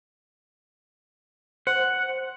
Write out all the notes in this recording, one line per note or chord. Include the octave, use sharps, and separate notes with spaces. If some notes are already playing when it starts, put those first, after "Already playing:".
C5 F#5